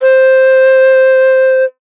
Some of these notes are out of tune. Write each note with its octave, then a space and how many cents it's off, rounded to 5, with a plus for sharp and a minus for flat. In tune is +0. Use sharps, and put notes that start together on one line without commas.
C5 +5